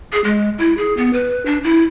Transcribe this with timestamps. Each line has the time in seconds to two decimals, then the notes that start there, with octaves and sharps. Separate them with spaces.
0.13 G#4
0.24 G#3
0.58 E4
0.77 G#4
0.97 B3
1.13 B4
1.46 D4
1.64 E4